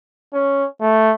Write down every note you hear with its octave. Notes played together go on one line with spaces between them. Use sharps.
C#4
A3